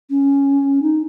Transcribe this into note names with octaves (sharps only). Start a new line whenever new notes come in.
C#4
D#4